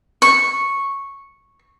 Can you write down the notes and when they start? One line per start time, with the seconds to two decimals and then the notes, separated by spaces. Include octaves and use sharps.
0.22 C#6